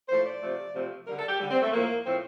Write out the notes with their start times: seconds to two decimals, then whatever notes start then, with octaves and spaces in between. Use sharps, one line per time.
0.08 A2 F3 A3 C5
0.25 D5
0.41 C3 F3 A3
0.74 C3 F3 A3
1.07 D3 G3 A#4
1.18 A4
1.28 G4
1.39 D3 G3
1.51 C4
1.61 A3
1.72 A2 F3 A3 A#3
2.05 A2 F3 A3 C4